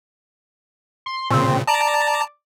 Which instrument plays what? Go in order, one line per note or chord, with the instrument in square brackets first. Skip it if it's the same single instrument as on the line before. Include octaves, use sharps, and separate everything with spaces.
[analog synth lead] C6
[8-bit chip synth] A#2 C#3 [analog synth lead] C4
[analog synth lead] D5 [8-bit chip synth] A5 A#5